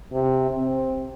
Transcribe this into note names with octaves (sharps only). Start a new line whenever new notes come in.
C3
C4